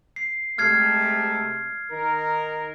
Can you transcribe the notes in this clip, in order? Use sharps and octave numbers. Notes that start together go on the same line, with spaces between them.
C7
C3 G#3 A3 F6 G#6 C7
D#3 D#4 A#4